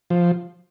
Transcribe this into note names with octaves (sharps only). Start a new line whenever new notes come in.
F3